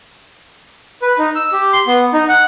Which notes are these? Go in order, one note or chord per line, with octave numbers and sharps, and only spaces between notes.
B4
D#4
E6
G4
C6
B3
D#4
F#5